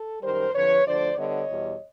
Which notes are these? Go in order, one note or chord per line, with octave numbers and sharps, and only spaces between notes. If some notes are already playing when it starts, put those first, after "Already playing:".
Already playing: A4
F#2 D#3 G3 A#4 C5
F2 D3 F3 B4 C#5
D2 D3 F3 C5 D5
D3 G3 B3 D4 C#5 D#5
E2 B2 G3